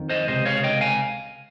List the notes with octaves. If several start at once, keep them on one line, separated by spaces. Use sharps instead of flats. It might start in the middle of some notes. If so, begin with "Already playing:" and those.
Already playing: F2 D#3
C5 D#5
C#2 C3 C5 D#5
C#5 F5
D#5 G5
F5 G#5